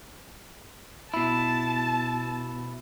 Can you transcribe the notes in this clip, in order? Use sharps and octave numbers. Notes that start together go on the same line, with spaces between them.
B2 E4 A5